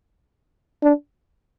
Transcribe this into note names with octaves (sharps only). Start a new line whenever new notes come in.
D4